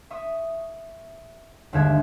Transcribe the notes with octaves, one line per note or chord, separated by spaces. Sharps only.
E5 C#6 D#6
G1 D#2 D3 G#3 E5 G#6